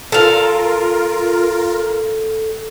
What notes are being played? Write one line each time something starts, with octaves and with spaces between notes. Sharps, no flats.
F4 A4 A#4 F5